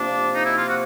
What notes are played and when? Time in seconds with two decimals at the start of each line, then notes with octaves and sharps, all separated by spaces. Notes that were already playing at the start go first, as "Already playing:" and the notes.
Already playing: C3 F3 A#3 D4
0.33 D#4
0.44 E4
0.56 F4
0.68 F#4